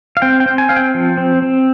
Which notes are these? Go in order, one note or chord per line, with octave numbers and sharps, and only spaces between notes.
F5
C4 G5
G5
C4
G#5
C4 F5
G5
F3
C4
C4